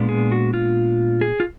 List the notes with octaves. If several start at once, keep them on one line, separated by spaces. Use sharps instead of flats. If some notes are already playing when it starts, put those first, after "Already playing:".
Already playing: A#2 G#3 B3 D4
G#4
F#4
F4
G#4
F4